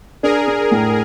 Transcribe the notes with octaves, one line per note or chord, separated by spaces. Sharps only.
D4 G#4 A#4
D4
A2